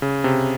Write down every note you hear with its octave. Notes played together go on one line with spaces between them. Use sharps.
C#3
C3